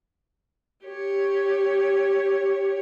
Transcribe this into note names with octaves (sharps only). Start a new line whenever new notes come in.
G4 C#5